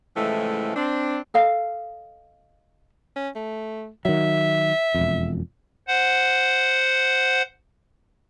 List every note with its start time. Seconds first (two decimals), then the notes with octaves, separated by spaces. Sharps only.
0.15 A2 C#3 E3 F3 G#3 A3
0.76 C4 D4
1.34 A4 D#5 F5
3.16 C#4
3.35 A3
4.05 D#3 F#3 E5
4.94 E1 F2
5.88 C5 F#5